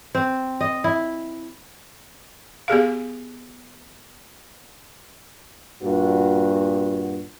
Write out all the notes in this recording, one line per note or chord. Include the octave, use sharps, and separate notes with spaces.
C4
D#5
E4
B3 G4 G#4 F5
G2 A#2 F#4